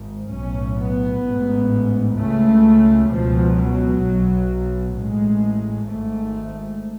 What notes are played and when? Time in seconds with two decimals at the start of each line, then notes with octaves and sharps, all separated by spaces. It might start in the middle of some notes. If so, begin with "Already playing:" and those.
Already playing: G#1 G#2
0.33 B1 A2 C#4
0.79 B3
1.25 A1 G#2
2.17 C#2 C#3 A3
3.09 C#2 B2 F3
3.55 F#3
4.02 B1 B2
4.94 A1 A2 G#3
5.86 G#1 G#2 A3